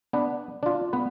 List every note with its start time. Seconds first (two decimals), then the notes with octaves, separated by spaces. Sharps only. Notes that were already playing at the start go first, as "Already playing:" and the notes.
0.13 B3 D4 B4
0.63 D4 F4
0.93 B3 B4